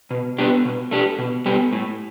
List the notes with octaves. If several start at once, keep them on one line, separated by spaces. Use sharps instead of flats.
B2
B3 D4 G4
B2
A3 D4 G4
B2
G3 B3 G4
A2